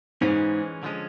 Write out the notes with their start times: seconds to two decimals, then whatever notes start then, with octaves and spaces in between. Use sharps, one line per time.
0.21 G#2 E3 G#3 C#4 F4
0.83 D3 F3 G#3 C#4